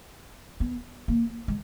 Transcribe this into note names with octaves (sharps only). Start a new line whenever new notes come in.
B3
A#3
G#3